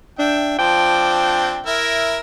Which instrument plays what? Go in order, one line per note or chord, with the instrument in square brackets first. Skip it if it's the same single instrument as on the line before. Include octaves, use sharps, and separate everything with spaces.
[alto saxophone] D4 [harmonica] E5 G5
[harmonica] F3 C4 D4 [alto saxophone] G5
[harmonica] E4 A#4 E5